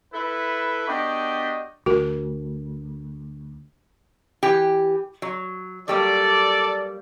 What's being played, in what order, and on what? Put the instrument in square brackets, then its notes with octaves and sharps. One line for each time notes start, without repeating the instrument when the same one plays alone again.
[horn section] E4 A4 B4
B3 D4 F#4 G4 D#5 G5
[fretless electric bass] D2 [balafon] F#4 A#4
[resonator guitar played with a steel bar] E3 G4
F#3
[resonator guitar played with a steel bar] F#3 G3 A#3 [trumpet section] A4 D5